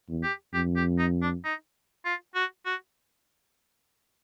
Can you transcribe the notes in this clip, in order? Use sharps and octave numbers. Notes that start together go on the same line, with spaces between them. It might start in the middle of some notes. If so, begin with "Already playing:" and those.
E2
G4
F2 G4
G4
D#4
D4
D#4
F4
F#4
F#4